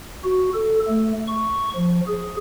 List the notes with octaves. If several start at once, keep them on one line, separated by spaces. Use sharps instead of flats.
F#4
A4
A3
C#6
F3
G#4